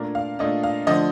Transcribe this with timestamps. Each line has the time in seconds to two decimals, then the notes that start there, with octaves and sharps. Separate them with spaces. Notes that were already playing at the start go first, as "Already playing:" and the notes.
Already playing: A#2 A3 D4 A#4
0.15 F5
0.39 A#2 A3 D4 D#5
0.63 F5
0.87 D3 F3 A3 D4 D#5